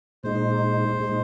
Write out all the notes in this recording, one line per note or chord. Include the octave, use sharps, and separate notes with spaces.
A#2 G#3 D#4 C5
A#2 G#3 D#4